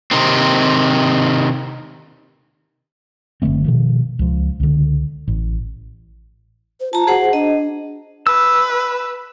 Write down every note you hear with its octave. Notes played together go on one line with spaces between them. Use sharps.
C3 D#3 C4
F#1 D3 A3 C4
B2 D#3 F3
C#2 F3
C#2 D3
A1
C5
F4 A5 A#5
F#4 G#4 C5 F#5
D4 D#5
B4 E6